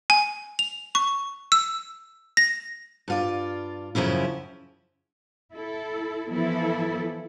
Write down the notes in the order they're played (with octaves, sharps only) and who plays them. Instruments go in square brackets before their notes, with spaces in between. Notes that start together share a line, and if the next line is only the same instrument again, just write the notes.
[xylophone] G#5
F7
C#6
E6
A#6
[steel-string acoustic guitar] G2 F4 D5
F#2 C#3 F3 C#4 E4
[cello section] E4 A4
E3 F3 B3 E4 A4